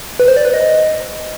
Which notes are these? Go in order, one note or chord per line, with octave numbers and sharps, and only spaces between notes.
B4
C5
D5
B4
D#5